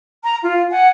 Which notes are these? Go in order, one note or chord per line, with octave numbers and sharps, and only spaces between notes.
A#5
F4
F#5 G#5